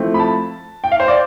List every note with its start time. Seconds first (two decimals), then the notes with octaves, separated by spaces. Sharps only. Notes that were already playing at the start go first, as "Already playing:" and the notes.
Already playing: F3 A3 C4 E4
0.14 B5
0.19 A5
0.84 G5
0.92 F5
1.00 C5
1.08 D5